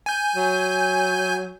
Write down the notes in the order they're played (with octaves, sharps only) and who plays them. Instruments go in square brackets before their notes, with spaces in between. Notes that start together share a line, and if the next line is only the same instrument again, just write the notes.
[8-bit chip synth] G#5 G6
[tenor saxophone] F#3